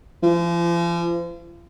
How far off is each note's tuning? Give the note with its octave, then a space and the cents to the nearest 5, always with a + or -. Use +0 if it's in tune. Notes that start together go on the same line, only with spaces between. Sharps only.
F3 -40